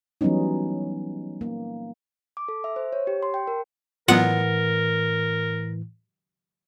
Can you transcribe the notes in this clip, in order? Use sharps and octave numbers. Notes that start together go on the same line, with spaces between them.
E3 F#3 G3 B3 C#4 D#4
A#3
D6
A4
E5
C5
C#5
G4
C6
G5
A#4
A2 E3 F#3 B3 F4 A#4 F#5